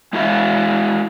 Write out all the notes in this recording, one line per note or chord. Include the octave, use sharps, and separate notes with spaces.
G#3 E4 F#4 E5 F5